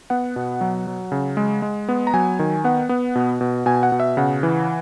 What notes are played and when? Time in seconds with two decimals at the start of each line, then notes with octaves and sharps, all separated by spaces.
0.10 B3 F#5
0.36 B2
0.61 F#3
0.87 F#3
1.12 C#3
1.37 G#3
1.62 G#3
1.89 B3
2.07 A#5
2.14 F#3 G#5
2.39 D#3
2.64 B3 F#5
2.89 B3
3.15 B2
3.41 B2
3.66 B2 G#5
3.83 F#5
3.92 B2
4.00 E5
4.17 C#3 F#5
4.43 E3